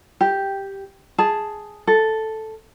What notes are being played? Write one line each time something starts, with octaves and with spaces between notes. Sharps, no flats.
G4
G#4 A5
A4